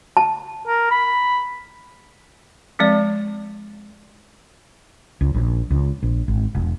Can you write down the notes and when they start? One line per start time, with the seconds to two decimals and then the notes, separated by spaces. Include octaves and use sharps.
0.17 A5
0.67 A#4
0.91 B5
2.79 F3 G#3 C4 D5
5.21 C#2
5.34 A#1
5.71 C#2
6.03 A#1
6.28 G#1
6.55 E1